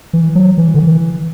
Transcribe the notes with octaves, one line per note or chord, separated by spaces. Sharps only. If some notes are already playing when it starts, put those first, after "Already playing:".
E3
F#3
E3
D3
E3